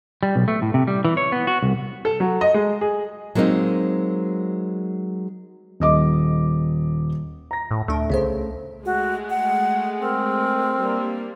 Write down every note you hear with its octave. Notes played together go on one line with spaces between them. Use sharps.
G3
B1
A3
A2
C3
G3
E3
C#5
B3
F#4
C2
A4
F#3
D#5
G#3
G#4
F#3 G#3 A#3 C4 D#4
D#1 D#5 D6
A#5 A#6
A2
D2 A3 D4
C2 C#3 B3 C5
G#3 A3 F#4
F#5
C4 A#4
G3 A#3 D4